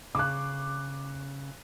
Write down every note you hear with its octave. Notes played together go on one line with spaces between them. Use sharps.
C#3 D6 F#6